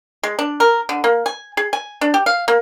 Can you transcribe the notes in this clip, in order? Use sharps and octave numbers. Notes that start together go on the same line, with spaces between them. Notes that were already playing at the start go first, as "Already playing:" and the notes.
G#3
D4
A#4
D3
A#3
G#5
G#4
G#5
D4
G4
F5
A#3